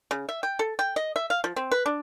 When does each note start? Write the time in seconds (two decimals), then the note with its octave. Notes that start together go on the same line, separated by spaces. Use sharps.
0.11 C#3
0.29 E5
0.43 G5
0.59 A4
0.79 G5
0.96 D#5
1.16 E5
1.30 F5
1.44 F3
1.56 C4
1.71 B4
1.86 D4